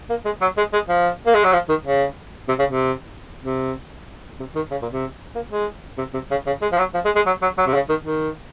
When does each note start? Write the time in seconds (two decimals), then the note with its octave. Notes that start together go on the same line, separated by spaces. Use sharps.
0.10 A#3
0.25 G#3
0.41 F#3
0.57 G#3
0.73 G#3
0.89 F3
1.26 A#3
1.35 G#3
1.44 F#3
1.53 F3
1.69 D#3
1.84 C#3
2.48 C3
2.59 C#3
2.69 C3
3.44 C3
4.40 C3
4.55 D#3
4.71 C#3
4.82 A#2
4.92 C3
5.35 A#3
5.51 G#3
5.98 C3
6.14 C3
6.31 C#3
6.47 C#3
6.62 G#3
6.72 F3
6.78 F#3
6.94 F3
7.05 G#3
7.15 G#3
7.26 F#3
7.42 F#3
7.58 F#3
7.67 C3
7.74 C#3
7.89 D#3
8.05 D#3